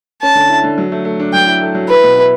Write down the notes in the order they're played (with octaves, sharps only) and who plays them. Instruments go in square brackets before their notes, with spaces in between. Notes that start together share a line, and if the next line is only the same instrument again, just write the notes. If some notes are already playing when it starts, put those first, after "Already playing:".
[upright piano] C#4 [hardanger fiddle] A5
[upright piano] D3
E4
D3
F#3
A3
A3
D4
[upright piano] F#3 [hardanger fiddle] G5
[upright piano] E4
A3
F#3
[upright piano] E4 [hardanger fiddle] B4
[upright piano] B2
E4